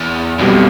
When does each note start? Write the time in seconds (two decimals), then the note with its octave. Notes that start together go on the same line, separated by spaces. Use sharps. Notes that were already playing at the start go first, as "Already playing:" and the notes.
Already playing: E2
0.39 B1 F2 B2 G3